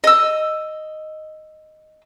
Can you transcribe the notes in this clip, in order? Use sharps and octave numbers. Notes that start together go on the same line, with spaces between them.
D#5 E6